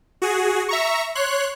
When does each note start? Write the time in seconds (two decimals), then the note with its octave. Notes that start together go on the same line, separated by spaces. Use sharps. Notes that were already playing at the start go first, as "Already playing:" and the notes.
0.22 F#4 G#4
0.68 E5 A#5 C#6
1.15 C#5 C6 F#6